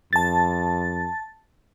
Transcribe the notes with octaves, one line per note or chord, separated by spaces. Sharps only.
F2 A5 A6